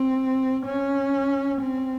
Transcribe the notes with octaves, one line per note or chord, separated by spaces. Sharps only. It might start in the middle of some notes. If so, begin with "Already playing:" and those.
Already playing: C4
C#4
C4